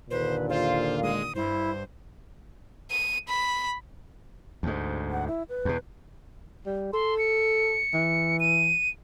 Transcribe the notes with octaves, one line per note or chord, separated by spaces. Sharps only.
D#2 A#2 D3 B4 C5
F4 C5 F5
G#3 D#6
G2 E4 C5
D#7
B5
D2 G#2
F#5
E4
B4
E2 B2
G3
A4 C6
C#7
E3
D#7